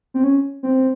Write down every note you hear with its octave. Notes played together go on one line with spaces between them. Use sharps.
C4
C#4
C4